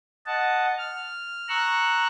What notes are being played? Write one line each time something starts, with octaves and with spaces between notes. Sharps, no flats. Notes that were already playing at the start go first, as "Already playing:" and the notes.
D#5 F#5 A5
F6
A#5 C#6 E6 F#6